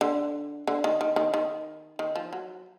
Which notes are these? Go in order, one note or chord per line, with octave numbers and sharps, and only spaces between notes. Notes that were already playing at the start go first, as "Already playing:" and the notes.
D3
D3
D#3
D#3
D#3
D#3
D#3
F3
F#3